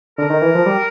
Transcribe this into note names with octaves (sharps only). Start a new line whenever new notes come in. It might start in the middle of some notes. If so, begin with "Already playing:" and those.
D3 A#4
D#3
E3
F3
G3